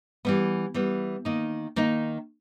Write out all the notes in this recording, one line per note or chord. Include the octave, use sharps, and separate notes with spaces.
E3 G3 B3
E3 G3 B3
D#3 A#3 D#4
D#3 A#3 D#4